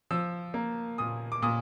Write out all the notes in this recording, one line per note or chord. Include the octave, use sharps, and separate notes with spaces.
F3 E6
A#3
A#2 D#6
D6
A#2 D#6